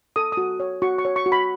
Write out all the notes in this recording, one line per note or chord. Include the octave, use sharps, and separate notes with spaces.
A4 D#6
D#6
F#4
C#5
F#4 C#6
C#6
C#5
C#6
F#4
B5